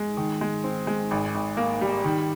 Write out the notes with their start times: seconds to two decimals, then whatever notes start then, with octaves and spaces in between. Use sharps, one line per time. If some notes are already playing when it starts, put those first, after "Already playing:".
Already playing: G#3
0.17 D#3
0.41 G#3
0.64 C4
0.87 G#3
1.11 G#1
1.35 G#1
1.57 A#3
1.81 G3
2.05 D#3